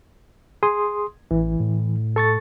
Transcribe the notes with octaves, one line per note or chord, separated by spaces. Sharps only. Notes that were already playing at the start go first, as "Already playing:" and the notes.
G#4 C6 D#6
A1 E3
A2
A4 C#6 A6